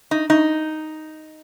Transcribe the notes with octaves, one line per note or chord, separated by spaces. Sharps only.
D#4
D#4